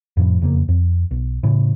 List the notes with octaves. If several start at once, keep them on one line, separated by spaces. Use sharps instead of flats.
F2 A2 F3
E1 F2 C#3 A#3
F2
B1
A2 C#3